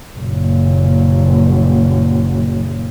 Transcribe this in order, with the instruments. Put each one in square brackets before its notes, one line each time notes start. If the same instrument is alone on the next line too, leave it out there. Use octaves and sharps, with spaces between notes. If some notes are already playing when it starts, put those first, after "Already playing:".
[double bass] F#1 A#2